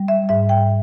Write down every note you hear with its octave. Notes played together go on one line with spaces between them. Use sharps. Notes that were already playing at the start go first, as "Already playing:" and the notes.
Already playing: G3
E5
G#2 E5
G5